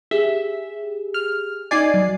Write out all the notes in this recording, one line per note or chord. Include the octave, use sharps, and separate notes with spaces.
G4 G#4 E5
F6
D#4 F#4 D5 D#5 G#5 C7
F#3